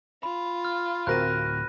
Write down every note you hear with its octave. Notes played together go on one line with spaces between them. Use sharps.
F4 B5
F6
D1 C4 F#4 A#4 F#6 A#6 D#7